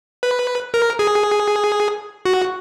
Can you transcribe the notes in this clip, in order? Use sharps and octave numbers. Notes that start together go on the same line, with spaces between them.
B4
A#4
G#4
F#4